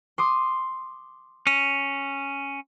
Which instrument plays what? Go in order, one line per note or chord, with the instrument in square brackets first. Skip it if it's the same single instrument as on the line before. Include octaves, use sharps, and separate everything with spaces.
[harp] C6 D6 D#6
[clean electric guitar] C#4